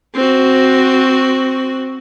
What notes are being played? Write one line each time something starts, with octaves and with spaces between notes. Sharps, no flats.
C4 F#4